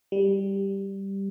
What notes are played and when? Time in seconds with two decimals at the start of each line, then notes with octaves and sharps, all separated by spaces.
0.12 G3